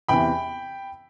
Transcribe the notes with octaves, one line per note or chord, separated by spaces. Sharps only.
E2 C3 E3 G5 B5